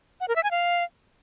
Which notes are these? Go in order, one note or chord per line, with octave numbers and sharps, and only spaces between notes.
F#5
A#4
E5
G#5
F5